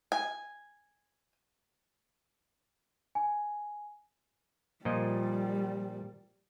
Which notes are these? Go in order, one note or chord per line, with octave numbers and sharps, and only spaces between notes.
G#5
G#5
A#2 F3 G3 D#5